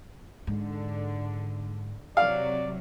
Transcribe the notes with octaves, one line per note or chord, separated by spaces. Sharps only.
G#2 D3
C3 F#3 D5 F5